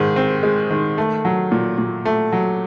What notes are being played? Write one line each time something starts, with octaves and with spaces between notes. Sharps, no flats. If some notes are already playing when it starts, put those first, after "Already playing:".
Already playing: G#2 D#3 G#3
C4
G#3
D#3
A3
F#3
A#2
A#2
A3
F#3